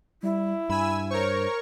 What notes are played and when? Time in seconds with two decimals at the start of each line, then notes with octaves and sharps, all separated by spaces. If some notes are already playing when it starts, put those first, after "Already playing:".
0.23 G3 E4
0.69 G2 G#5 B5 E6
1.10 A#4 C5 C#5 C#6